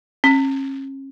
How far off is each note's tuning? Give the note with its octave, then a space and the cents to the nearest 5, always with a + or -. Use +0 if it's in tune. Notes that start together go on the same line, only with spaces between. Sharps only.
C#4 -35